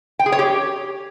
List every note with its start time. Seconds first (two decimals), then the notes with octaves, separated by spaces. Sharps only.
0.19 G5
0.26 G#4
0.32 C#5
0.39 G4